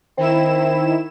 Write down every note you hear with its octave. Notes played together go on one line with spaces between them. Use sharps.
D#3 C4 E4 E7